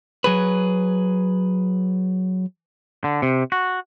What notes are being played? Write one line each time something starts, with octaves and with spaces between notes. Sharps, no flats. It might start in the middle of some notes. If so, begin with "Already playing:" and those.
F#3 G#4 B4
D3
C3
F#4